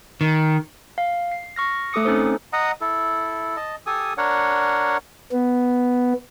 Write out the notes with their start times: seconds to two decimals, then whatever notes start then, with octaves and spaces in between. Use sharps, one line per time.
0.21 D#3
0.98 F5
1.32 C7
1.56 C#6 F6 A#6
1.93 A3 A4 D6 D#6 C#7
2.05 C4 C#4 D#4 A4 C5
2.53 D#5 F#5 A#5 D#6
2.81 E4 A4
3.57 D#5 A5
3.86 G4 A4 G#5 D#6
4.18 D4 A#4 C#5 F#5
5.32 B3